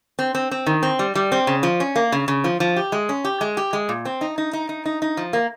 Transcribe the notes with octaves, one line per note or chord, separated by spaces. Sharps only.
C4
C4
C4
D#3
C4
G3
G3
C4
C#3
F3
C#4
A#3
C#3
C#3
F3
F3
G4
G#3
C#4
G4
G#3
G4
G#3
A#2
C4
D#4
D#4
D#4
D#4
D#4
D#4
F3
A#3